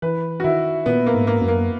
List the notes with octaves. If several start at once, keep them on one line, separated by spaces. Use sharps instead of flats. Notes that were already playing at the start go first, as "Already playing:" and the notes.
E3 B4
F#4
D#3 E4
A#2 B3
A#3
G#2
A#3
F#2
A#3